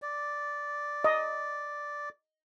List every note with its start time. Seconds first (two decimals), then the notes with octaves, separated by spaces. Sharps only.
0.02 D5
1.04 D#5